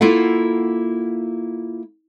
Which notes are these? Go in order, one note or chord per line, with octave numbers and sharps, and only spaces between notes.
A#3 E4 F4 A4 F#5